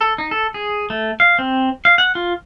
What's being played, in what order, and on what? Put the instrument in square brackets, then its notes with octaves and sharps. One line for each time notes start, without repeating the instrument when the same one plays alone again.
[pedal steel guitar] A4
D#4
A4
G#4
A3
F5
C4
F5
F#5
F4